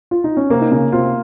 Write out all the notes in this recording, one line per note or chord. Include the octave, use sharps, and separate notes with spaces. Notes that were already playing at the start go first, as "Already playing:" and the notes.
F4
D#4
C#4
C3 A#3 C4
D#4
C#3 C#4
C3 C4 F4